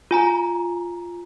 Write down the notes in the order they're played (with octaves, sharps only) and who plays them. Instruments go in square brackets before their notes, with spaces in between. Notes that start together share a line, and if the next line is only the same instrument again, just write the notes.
[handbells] F4 G#5 A#5